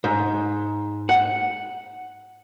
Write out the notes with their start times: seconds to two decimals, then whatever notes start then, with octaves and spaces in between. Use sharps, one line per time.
0.04 G#2
1.09 F#5